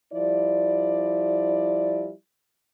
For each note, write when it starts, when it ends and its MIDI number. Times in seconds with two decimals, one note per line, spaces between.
0.13 2.10 53
0.13 2.10 55
0.13 2.10 64
0.13 2.10 74